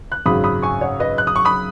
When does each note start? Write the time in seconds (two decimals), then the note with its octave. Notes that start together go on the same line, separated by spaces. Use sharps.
0.12 F#6
0.26 G#1 F#2 C#3 F#3 B5 D#6
0.44 B5 D#6
0.62 G#5 C#6
0.81 C#5 F#5
1.00 B4 D#5
1.18 F#6
1.27 D#6
1.36 C#6
1.45 B5 D#6